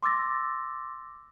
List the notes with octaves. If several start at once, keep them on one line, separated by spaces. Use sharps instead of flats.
C6 D6 E6 A6 A#6